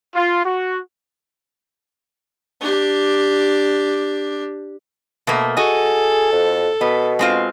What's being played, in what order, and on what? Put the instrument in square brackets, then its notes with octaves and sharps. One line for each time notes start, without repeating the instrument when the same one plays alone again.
[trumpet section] F4
F#4
[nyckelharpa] D4 G4
[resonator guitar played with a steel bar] B2 A3 A#3
[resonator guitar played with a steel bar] F#4 D#5 [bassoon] G#4 [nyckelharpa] A4
[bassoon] F2
[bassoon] B2 [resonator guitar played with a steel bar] B3
[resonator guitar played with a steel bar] G#3 C4 F4